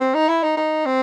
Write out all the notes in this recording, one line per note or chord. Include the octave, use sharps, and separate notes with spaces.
C4
D#4
E4
D#4
D#4
C4